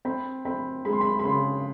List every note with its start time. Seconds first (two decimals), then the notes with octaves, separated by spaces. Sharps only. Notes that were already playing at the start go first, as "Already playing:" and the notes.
0.05 C4 B5
0.45 C4 B5
0.85 G#3 B5
0.93 C6
1.01 B5
1.19 B5
1.25 C#3 C6